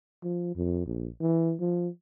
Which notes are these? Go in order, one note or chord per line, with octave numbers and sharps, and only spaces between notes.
F3
F2
A#1
E3
F3